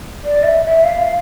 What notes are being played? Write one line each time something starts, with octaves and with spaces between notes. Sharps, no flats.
D5
E5
E5
F5